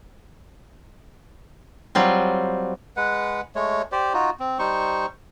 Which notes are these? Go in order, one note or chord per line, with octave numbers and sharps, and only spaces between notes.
F#3 G3 C4 F4
G#3 B4 F#5
G#3 A3 C#5
G4 C5 D5
D#4 F4 F#4
C4
G3 D#4 C5 C#6